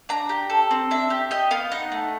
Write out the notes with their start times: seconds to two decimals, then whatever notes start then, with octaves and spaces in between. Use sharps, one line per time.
0.09 D4 A#5
0.29 G4
0.50 A4
0.71 C4
0.91 D4 E5
1.10 G4
1.31 G4 D#5
1.51 B3 F5
1.72 D#4 F#5
1.92 A3